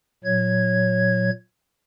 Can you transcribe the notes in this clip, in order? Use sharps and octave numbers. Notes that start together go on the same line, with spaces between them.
A#2 F#3 C#5 G#6